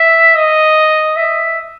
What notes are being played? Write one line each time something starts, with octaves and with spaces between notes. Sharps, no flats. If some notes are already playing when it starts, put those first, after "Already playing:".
Already playing: E5
D#5
E5